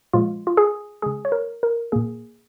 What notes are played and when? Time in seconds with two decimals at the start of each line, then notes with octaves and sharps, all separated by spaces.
0.13 A#2 F3 G#3 F4
0.47 F4
0.57 G#4
1.02 C#3 G#3 G#4
1.25 C#5
1.32 A#4
1.63 A#4
1.92 A#2 A#3 G#4